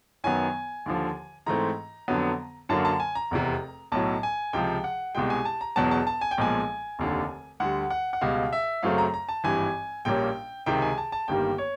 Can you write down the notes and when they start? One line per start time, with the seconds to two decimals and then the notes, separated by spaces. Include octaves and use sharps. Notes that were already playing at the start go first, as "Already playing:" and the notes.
0.24 F#2 D#3 F#3 B3 G#5
0.86 D#2 D3 F3
1.46 G#2 E3 A3 C4 A#5
2.08 F2 D3 F#3 B3
2.69 F#2 D3 F#3 A#3 A5
2.85 A5
3.00 G#5
3.15 A#5
3.31 F1 E2 C3
3.92 B1 A2 F#3 A5
4.23 G#5
4.53 C#2 C3 F3 G5
4.84 F#5
5.15 C2 B2 G#3 G5
5.30 G#5
5.45 A5
5.61 A#5
5.76 E1 E2 B2 F#3 A5
5.91 A5
6.07 A5
6.21 G#5
6.31 G5
6.38 B1 A#2 F3 G#3 G#5
6.99 F1 D#2 D3
7.60 D2 D3 G3 F#5
7.90 F#5
8.13 F#5
8.21 C#2 B2 G3 F5
8.53 E5
8.83 F#2 C#3 F#3 A3 C4 F5
8.98 A#5
9.14 A#5
9.29 A5
9.44 G#1 G2 E3 G#5
10.05 A#1 A#2 G3 A#3 C#4 G5
10.66 C#2 C3 D#3 G5
10.82 G#5
10.98 A5
11.12 A5
11.28 G1 G2 D#3 G3 A#3 G5
11.58 C#5